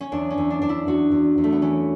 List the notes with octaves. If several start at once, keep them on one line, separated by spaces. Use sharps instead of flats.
C#4
E2 D4
C#4
E2
D4
E2 D4
E4
E2 F#4
E2
E2
A3
B3
E3 C#4